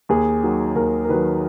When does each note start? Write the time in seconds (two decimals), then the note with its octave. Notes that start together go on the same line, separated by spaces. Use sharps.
0.09 D#2 G#4
0.43 D#3 F#3
0.76 D#2 A#4
1.05 A#4
1.09 D#3 F#3 B4